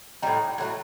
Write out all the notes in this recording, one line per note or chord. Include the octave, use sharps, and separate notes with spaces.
A2 G3 D#4
A2 F#3 A3